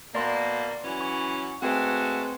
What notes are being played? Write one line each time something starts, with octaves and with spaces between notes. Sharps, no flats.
B2 A#3 D5 C6
E3 F#3 C#4
C#6
G#3 A3 C4 F#4 B4